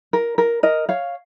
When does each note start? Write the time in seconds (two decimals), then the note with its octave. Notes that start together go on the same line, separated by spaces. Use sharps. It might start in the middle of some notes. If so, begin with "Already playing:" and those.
0.13 A#4
0.38 A#4
0.63 A#4 D#5
0.89 C#5 F5